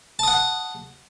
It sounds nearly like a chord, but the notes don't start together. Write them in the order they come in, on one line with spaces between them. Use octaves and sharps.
A5 D#6 F#5